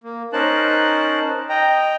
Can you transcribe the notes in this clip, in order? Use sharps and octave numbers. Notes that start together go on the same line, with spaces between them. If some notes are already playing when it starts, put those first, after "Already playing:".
A#3
C#4 D#4 A#4 C5 A5 F#6
D#5 G5 A#5